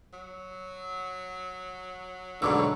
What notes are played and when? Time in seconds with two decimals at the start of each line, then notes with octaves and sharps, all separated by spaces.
0.13 F#3
2.42 B1 G#2 B2 D3 F#3 A#5 D6 E6